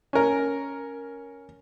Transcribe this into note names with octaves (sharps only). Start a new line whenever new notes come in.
C#4 A#4